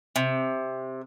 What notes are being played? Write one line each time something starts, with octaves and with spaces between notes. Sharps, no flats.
C3